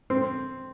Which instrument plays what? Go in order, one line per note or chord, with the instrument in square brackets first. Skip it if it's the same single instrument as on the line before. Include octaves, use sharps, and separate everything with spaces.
[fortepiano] C4